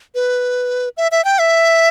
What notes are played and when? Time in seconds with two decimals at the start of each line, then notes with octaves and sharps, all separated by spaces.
0.15 B4
0.97 E5
1.11 E5
1.25 G5
1.39 E5